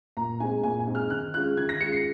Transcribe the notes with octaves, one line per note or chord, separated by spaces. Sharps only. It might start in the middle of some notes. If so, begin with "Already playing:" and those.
A#2 A#5
G#3 C4 D#4 G#5
A#2 G#5
G#5
G#3 C4 D#4
F6
D#3 F#6
G#3 C#4 F4 F#6
D#3 G#6
A#6
G#3 C#4 F4 C#7
C7